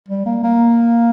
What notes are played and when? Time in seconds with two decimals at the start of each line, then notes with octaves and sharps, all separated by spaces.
0.09 G3
0.26 A#3
0.44 A#3